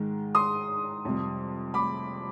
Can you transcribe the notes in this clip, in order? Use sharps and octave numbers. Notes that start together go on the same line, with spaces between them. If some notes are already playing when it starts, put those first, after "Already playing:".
Already playing: G#2 D#3 G#3
C6 D#6
F2 C3 G3
B5 D6